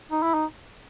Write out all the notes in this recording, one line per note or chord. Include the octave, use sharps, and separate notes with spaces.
D#4
E4
D#4